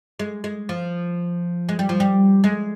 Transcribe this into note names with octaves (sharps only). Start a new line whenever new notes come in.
G#3
G#3
F3
G#3
G3
F3
G3
G#3